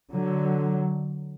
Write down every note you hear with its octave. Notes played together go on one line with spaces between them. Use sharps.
D3 F#3